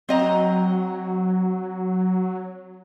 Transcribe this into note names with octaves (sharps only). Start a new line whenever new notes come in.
F#3 C4 D#5 A#5